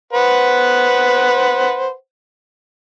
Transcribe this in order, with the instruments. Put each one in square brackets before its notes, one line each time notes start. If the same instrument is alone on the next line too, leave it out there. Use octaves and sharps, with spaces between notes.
[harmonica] B4 C5 F#5